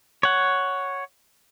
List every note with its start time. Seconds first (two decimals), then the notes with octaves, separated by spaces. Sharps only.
0.23 C#5 F#5